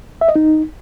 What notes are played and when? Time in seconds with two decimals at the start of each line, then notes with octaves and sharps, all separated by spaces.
0.21 E5
0.28 D#5
0.36 D#4